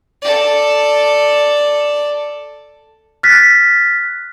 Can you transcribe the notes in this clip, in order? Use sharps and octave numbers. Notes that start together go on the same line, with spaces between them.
A4 D5
F6 F#6 A6 B6